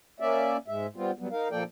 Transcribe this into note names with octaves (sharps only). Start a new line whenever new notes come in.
A#3 C#4 D5 E5
G#2 G#3 E5
G3 B3 C4 F4
F#3 G3 B3
D#4 A#4 F5
A#2 F3 A#3 A4 D5 G5